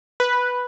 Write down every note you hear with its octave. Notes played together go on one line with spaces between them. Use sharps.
B4